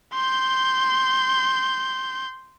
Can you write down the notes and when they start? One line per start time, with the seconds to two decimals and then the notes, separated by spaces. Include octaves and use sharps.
0.13 C6 G6